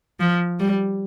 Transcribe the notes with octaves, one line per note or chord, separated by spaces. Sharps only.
F3
G3